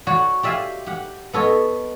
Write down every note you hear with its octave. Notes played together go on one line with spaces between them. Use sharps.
F#4 C#5 D5
G4 D5 E5 F5 G#5
G4 F#5
B3 A4 C#5 D#5